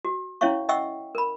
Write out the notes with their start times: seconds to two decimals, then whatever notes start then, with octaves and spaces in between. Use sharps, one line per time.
0.05 F#4
0.41 C#4 E4 C#5 E5 F5 C#6
0.69 D#5 E5 F#5 G5 C#6 E6
1.15 A#4 B5